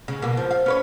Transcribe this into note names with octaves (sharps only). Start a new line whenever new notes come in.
C#3
B2 A#3
F3
F5
C#4 B4 C#5